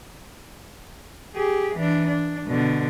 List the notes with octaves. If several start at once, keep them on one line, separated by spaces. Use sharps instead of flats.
G4 G#4
E3 D4
D4
B2 D3